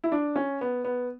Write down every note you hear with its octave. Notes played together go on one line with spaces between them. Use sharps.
E4
D4
C#4
B3
B3